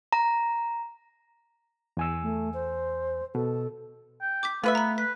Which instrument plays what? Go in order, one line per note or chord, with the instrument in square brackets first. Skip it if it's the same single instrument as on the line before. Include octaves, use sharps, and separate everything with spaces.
[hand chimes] A#5
[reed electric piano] E2 G#5 E6
[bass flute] A3
C5
[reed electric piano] B2 [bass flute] A4
[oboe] G5
[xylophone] D6 G6 B6
[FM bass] A3 [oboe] B3 [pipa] F4 B4 E5
[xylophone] A#5 B5
[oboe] B4 [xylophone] B6